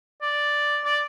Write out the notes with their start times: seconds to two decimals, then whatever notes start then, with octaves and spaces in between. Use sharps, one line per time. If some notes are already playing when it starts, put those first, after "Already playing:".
0.22 D5
0.85 D5